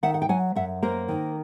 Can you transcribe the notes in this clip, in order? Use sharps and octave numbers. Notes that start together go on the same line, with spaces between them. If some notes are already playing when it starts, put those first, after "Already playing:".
D#3 E5 F#5
F#5
G5
F#3 F#5 G#5
F#2 E5 F#5
A#3 A#4 C5
D#3